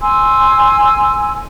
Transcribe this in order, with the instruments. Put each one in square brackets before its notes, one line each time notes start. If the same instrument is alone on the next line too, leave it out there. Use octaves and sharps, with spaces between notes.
[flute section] G#5 C6 E6